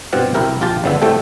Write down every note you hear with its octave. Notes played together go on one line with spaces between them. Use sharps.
G2 B2 C4 F4 F#5
C2 E4 G4 A#4 G5
A#1 F4 G4 A5
G1 E2 C#3 B3 D4 E5
A2 G3 A3 C4 A4 G5